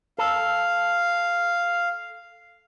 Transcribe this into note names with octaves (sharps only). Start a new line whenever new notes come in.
A4 F5